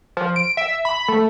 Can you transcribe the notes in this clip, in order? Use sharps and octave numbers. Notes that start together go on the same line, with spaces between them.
F3
D7
E5
B5
A3